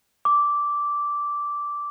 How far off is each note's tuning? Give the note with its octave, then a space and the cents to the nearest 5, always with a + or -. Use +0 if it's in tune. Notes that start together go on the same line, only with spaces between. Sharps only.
D6 -10